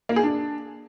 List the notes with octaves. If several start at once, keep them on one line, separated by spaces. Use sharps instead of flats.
A#3
G#4
D4